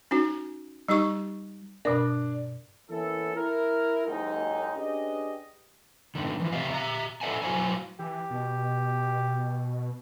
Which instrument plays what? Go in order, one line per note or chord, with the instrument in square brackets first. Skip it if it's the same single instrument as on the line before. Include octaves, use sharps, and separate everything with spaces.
[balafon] C#4 D#4 F#4
G3 D#4 G4 C#6
[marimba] G2 B2 A#4 [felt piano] D4
[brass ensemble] E3 A#3 B3 C#4 E4 A4
E4 A#4
F#1 D#2 G#2 D#4
C#4 D4 G4 G#4 B4 D#5
[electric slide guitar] G2 D3 D#3
E3 F3
C#3 C4 F4 G4 E5 F5
G4 E5 A#5
A4 D5 E5 F#5 G#5
F#3 E4 F#4 C5 F5 G#5
[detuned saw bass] E3 [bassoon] G4
[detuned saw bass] B2